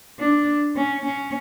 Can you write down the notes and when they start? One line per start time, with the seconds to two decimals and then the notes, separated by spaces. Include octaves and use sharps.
0.20 D4
0.76 C#4
1.05 C#4